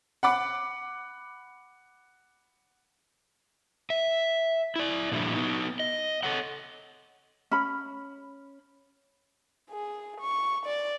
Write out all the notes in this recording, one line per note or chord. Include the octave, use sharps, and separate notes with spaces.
F#5 B5 D6
E5
E4 D5
A#2 D3 F3 G3 D4 E4
B3 D#4
D#5
A4 C#5 F#5
C#4 B5
G#4
C#6
D5